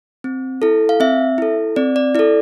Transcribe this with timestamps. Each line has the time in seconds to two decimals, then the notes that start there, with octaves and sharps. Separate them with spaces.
0.24 C4
0.62 E4 A4
0.89 F5
1.00 C4 E5
1.38 E4 A4
1.76 C4 D5
1.96 D5
2.15 E4 D5
2.19 A4